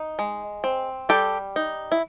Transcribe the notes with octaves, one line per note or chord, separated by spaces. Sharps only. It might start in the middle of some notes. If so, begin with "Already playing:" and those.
Already playing: D#4
G#3
C4
G3 G4 A4
D#4
E4